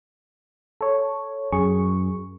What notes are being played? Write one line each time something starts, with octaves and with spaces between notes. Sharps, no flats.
A4 C#5
F#2 G#4 C#6